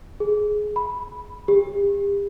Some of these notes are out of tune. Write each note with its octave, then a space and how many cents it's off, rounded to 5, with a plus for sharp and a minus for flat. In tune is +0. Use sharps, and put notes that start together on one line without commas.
G#4 +15
B5 -5
G4 +40